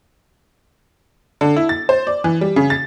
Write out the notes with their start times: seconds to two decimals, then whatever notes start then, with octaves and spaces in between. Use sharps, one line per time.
1.41 D3
1.56 E4
1.69 A6
1.89 C5
2.07 D5
2.24 E3
2.41 G3
2.56 C#3
2.70 A6